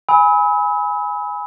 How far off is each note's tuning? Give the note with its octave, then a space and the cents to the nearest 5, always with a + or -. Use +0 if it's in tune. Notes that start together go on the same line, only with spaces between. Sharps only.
G#5 -5 B5 +0 E6 -45